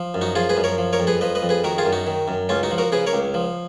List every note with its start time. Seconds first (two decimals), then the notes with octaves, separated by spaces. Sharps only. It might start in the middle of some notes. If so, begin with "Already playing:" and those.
Already playing: F3
0.14 F#2
0.21 D#4 F#4
0.35 F3 F4 G#4
0.49 G#4 B4
0.57 F#2
0.64 A#4 C#5
0.78 F3
0.93 A#4 C#5
1.00 F2
1.07 G#4 B4
1.21 F3 B4 D#5
1.35 B4 D#5
1.42 F2
1.49 G#4 B4
1.64 D#3 F#4 A#4
1.78 F4 G#4
1.86 F#2
1.92 D#4 F#4
2.07 D#3
2.28 F#2
2.49 C#2 C#4 F4
2.63 D#4 F#4
2.71 F3
2.78 F#4 A#4
2.92 C#3 G#4 B4
3.07 A#4 C#5
3.13 C#2
3.34 F3